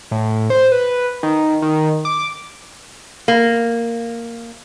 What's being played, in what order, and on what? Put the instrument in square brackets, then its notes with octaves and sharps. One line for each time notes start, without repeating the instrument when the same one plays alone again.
[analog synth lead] A2
C5
B4
D#3
D#3
D6
[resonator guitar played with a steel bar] A#3